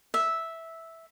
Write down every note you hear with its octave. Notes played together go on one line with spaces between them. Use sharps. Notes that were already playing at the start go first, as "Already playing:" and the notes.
E5